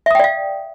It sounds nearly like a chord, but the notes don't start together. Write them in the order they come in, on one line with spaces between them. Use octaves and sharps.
E5 D#6 G5 D5 F5